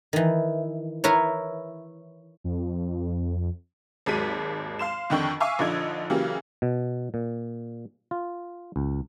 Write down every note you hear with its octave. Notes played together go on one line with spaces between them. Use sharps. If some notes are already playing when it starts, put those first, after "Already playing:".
D#3 E3
E4 A#4 B4 C#5
F2
G#1 D#2 F#3 G#3 B6 D#7
F5 C6 E7
F2 D3 D#3 G5 C#6
E5 F5 G#5 C#6 D6 E6
A#1 D3 F3 D#4 G#6
C#3 E3 F#3 A#3 G4
B2
A#2
F4
C#2